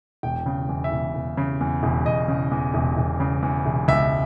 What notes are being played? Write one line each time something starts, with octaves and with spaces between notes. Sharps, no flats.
E1 G5
C#3
E2
E5
E1
E1
C#3
E2
E1
E1 D#5
C#3
E2
E1
E1
C#3
E2
E1
C#2 E5